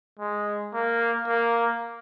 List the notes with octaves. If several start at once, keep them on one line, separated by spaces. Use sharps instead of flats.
G#3
A#3
A#3